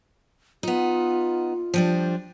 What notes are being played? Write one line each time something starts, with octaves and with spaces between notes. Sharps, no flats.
B3 D#4 F4
F3 G3 D4